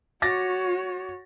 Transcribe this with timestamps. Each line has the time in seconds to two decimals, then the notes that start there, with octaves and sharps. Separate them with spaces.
0.22 F#4 C#5 D6 A6 A#6